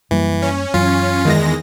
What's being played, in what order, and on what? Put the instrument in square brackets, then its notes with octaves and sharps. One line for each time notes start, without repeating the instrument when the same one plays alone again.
[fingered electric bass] F#2 G3 A#3 [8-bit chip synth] E3
[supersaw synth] C#4
[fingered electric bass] F#2 E3 F#3 [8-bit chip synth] F4
[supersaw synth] E2 G#3 A#6 [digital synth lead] D#3